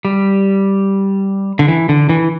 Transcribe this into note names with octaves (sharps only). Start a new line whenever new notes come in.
G3
D3
E3
D3
E3